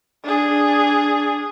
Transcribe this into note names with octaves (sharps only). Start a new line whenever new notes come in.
D4 G#4